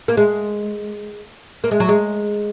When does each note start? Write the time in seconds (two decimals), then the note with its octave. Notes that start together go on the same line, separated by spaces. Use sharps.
0.08 A#3
0.17 G#3
1.64 A#3
1.71 G#3
1.80 F#3
1.89 G#3